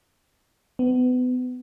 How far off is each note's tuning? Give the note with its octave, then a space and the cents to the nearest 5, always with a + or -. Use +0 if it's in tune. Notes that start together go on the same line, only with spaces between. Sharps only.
B3 +30